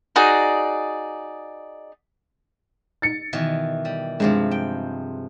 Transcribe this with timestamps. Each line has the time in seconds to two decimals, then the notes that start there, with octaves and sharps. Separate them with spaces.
0.16 D#4 F#4 G#4 D5
3.02 A6 C#7
3.33 B2 D#3 E3
3.85 G3
4.20 G2 C3 F3 G#3
4.51 G5